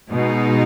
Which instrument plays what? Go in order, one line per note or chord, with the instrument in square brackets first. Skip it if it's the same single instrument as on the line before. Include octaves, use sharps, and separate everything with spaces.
[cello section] B2 G#3 D#4